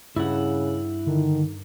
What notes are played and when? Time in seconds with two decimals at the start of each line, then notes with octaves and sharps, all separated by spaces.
0.16 G2 C#3 E4 F#5
1.07 D3 D#3